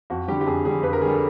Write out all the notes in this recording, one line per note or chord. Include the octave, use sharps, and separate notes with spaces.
F2 F#4
D3 G3 G4
G4
F2 G#4
D3 G3 G#4
F2 B4
A#4
D3 G3 G#4
A4